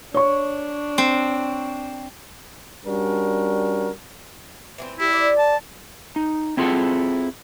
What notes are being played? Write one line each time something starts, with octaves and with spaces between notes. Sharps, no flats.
D4 C#5 C#6
C4
G3 C#4 D4 F#4 A#4
E3 B3 C4
G3 E4
C4 D5
A5
D#4
C4 E4 F4 G#4 A4 F#5